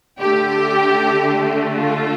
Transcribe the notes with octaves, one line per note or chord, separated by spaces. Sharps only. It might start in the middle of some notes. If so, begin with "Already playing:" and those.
D3 A3 G4
F4